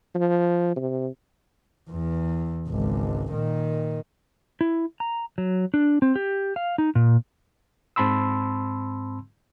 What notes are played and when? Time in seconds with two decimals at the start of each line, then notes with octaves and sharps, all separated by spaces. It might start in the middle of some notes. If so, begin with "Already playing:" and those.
0.15 F3
0.76 C3
1.90 E2
2.69 G#1 C#2
3.32 A#2 D#3
4.61 E4
5.00 A#5
5.38 F#3
5.74 D4
6.02 C4
6.16 G4
6.56 F5
6.78 D#4
6.95 A#2
7.96 G#2 C4 A5 B5 C6 E6